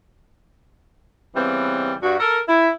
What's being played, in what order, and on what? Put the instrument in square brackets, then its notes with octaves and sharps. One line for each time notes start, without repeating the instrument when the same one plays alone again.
[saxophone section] C#3 E3 G3 B3 C4
G2 F#4
A4 A#4
E4